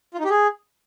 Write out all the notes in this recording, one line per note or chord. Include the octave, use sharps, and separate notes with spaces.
F4
D#4
G4
G#4